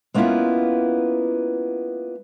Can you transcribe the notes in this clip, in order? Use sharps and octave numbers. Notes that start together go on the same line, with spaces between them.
G#3 A#3 B3 C#4 E4 F4